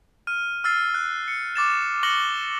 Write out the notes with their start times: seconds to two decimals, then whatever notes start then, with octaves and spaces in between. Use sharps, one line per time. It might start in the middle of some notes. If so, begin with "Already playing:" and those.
0.27 F6 D#7
0.64 E6 F6 A6 C7
0.95 F#6
1.28 C#7
1.55 C#6 D6 A6 E7
2.03 C#6 F#6 A#6 C#7 F#7 G7